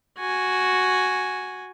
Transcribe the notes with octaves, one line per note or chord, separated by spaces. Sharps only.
F#4 G#5